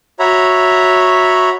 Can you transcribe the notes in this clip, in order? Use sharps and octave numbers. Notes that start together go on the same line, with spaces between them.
F#4 C#5 E5 A#5 B5